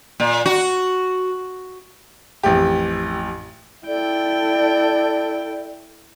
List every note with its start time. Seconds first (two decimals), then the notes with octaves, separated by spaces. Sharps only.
0.20 A#2
0.46 F#4
2.43 A1 F2 G4
3.87 E4 A4 D5 G5